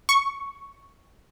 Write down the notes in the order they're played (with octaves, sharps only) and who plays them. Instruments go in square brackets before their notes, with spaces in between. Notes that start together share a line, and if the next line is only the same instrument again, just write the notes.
[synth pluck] C#6